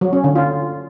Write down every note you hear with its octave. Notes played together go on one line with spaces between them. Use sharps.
F#3
C#4
D3
F4